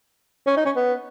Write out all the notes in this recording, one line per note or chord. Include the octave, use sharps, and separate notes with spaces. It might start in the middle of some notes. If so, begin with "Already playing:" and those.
C#4
D#4
C#4
B3